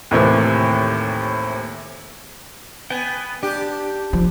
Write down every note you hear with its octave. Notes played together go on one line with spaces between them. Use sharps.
D#2 A2 C3 E3
B3 G5 G#5
D4 G4
F3